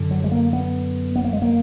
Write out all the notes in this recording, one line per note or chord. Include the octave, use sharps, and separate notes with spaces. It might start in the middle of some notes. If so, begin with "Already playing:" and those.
Already playing: F#2 D3
F#3
G#3
A#3
B3
B3
A#3
G#3
A#3